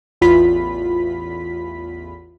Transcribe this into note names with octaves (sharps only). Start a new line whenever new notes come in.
A1 E2 F4 B5 B6